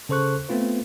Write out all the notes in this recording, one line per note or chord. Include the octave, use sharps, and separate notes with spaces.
C#3 A4 C5 C#6 F#6
A3 B3 C4 F4 B4